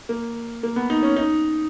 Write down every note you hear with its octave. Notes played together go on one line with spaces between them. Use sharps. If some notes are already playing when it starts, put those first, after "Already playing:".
A#3
A#3
B3
D#4
C#4
D#4